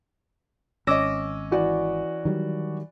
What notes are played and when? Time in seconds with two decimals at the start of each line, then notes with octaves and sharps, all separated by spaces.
0.87 G#1 C#4 D#5 D6 E6 A#6
1.51 E3 F#4 D5
2.25 D#3 F#3 G3